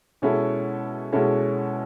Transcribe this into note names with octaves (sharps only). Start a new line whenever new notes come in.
B2 G#3 C#4 E4 A4
B2 G#3 C#4 E4 A4